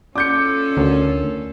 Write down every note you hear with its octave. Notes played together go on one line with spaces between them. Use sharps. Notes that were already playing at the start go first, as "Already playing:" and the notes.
C#4 F4 A4 D5 D6 G6 C#7
D2 D4 A#4 C#5